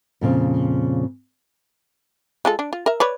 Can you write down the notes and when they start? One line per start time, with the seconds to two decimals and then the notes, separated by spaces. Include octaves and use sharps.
0.21 F2 A#2 C#3 C4
2.45 G#3 F4 A4
2.59 D4
2.73 F4
2.86 A#4 E5
3.00 B4 C#5 D5